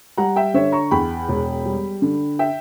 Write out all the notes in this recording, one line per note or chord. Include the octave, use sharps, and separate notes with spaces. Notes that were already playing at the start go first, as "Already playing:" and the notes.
G3 F#5 A#5
E5 G5
D3 C#5 E5
A#5 C#6
E2 G5 B5
E1
G3
D3
E5 G5